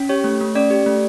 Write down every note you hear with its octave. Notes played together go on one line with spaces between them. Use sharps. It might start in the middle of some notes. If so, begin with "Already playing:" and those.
Already playing: C#4
G4 C#5
A3
A3
C#4 D5
G4
A3